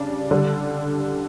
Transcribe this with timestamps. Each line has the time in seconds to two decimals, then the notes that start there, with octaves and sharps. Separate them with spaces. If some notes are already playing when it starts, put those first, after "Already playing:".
Already playing: C#3 G3 D4
0.31 D3 G3